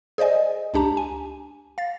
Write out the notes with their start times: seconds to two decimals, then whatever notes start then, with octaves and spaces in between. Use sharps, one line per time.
0.18 G#4 C5 D5 D#5 G#5
0.74 C#2 D4 G4 A5 A#5
0.97 G#5
1.78 F5 A6